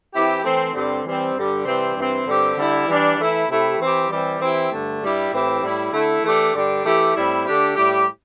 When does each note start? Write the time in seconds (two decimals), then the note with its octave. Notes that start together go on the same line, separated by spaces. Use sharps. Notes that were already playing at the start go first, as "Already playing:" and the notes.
0.14 E3 C4 E4 G4
0.44 E3 A3 C4
0.74 G2 D3 G3 C4
1.05 E3 G3 C4
1.35 G2 D3 G3 D4
1.65 C3 E3 G3 C4
1.96 G2 E3 C4
2.27 G2 D3 C4 G4
2.57 D3 G3 E4
2.88 E3 G3 D4
3.19 E3 A3 E4
3.49 C3 A3 E4 G4
3.79 E3 C4 E4 G4
4.09 E3 G3 C4 E4 G4
4.40 E3 C4 E4 G4
4.71 G2 D3 A3
5.02 G2 G3 E4 G4
5.32 A2 E3 C4 E4 G4
5.63 A2 G3 E4
5.93 D3 A3 E4
6.23 E3 A3 D4 G4
6.54 G2 D3 G3 D4 G4
6.84 E3 A3 E4 G4
7.16 A2 G3 C4 E4
7.46 D3 A3 D4 G4
7.76 A2 G3 E4 G4